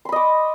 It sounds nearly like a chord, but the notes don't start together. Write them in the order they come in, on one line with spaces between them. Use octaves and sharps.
C6 B5 D#5 D6